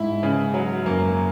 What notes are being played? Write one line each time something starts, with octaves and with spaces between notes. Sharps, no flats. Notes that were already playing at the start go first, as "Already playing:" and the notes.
Already playing: G#2 E4
C#3
F#3
F#2 A#3